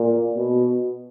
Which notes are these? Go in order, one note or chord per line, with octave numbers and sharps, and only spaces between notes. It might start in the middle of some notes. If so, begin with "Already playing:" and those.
Already playing: A#2
B2